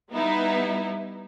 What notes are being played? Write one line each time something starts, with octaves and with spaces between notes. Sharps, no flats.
G3 B3 D#4 E4